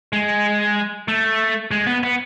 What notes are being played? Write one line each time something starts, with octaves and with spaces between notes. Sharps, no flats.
G#3
A3
G#3
B3
B3